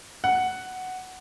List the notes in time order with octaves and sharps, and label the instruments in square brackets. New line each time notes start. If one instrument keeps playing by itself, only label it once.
[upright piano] F#5